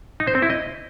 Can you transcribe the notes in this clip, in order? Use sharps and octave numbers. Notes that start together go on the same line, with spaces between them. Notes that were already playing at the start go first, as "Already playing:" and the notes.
D#4
C5
C4
E4
D#5